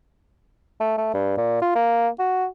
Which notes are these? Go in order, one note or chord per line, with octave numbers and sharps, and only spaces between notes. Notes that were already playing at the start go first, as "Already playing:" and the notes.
A3
A3
G2
A#2
F4
A#3
F#4